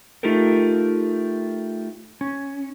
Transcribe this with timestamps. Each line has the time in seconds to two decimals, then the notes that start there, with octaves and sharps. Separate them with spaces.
0.23 A3 D#4 F4 G4 A4 A#4
2.21 C#4